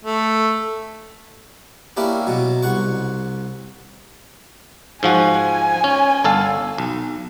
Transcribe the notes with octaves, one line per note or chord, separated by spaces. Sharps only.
A3
A#3 C#4 D4 E4 G4
B2 F#3
C2 F#5 C#6
G#2 F3 F#4 G#5
C#4
G1 A4 F5
B1